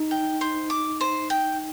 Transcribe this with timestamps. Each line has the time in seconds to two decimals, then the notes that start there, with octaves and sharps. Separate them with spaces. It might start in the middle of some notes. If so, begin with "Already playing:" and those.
Already playing: D#4
0.11 G5
0.41 C5
0.70 D6
1.01 C5
1.30 G5